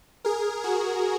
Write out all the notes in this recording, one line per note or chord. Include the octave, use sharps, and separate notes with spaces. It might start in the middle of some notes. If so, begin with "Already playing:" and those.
G#4 A#4
F#4 G#4